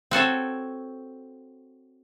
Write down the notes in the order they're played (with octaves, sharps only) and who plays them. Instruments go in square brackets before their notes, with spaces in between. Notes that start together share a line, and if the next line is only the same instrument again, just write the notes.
[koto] C4 F#4 A4 C#5